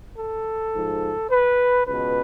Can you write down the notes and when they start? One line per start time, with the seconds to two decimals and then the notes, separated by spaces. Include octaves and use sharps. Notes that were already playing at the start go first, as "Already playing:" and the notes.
0.18 A4
0.75 G#2 F3
1.30 B4
1.87 C#2 B2 B4